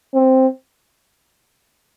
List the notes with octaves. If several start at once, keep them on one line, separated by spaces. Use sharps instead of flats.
C4